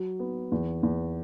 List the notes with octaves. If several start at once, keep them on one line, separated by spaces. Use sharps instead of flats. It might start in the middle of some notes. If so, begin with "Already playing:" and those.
Already playing: F#3
B3
E2
E2